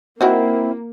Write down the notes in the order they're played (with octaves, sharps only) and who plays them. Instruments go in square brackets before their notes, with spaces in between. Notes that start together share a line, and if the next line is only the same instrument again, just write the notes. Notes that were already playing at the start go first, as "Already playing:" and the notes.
[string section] A#3 [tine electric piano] C4 E4 [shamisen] D#4 F#4 A#4